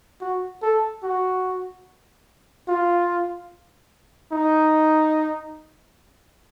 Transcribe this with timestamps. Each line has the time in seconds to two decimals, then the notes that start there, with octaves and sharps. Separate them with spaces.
0.21 F#4
0.62 A4
1.03 F#4
2.68 F4
4.33 D#4